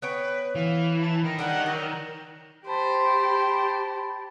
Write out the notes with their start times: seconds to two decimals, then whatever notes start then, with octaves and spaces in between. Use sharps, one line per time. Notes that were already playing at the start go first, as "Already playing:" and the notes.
0.02 B3 B4 C#5 G5
0.55 E3 F5
1.01 A5
1.24 D#3 D#5
1.39 G3 D4 D#4 F#5
1.66 F#3 D#5
2.68 G4 C5 A5 B5